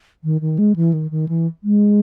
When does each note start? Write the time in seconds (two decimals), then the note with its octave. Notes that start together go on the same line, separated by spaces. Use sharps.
0.24 D#3
0.41 D#3
0.58 G#3
0.76 E3
0.93 D#3
1.11 D#3
1.28 E3
1.63 G#3